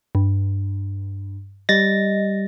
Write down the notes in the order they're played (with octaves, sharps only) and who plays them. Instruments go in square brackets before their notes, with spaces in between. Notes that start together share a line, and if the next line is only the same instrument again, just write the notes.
[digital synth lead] G2
[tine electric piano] G3 A6 A#6 [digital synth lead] D#5